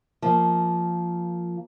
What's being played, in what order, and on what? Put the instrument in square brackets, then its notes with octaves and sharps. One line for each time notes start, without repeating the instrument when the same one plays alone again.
[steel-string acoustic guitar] F3 A#3